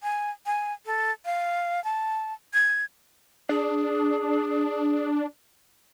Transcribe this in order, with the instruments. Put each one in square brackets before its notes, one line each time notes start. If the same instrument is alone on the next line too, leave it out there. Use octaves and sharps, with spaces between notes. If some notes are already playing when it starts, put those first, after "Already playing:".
[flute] G#5
G#5
A4
F5
A5
G#6
[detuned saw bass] D4 [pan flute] G#4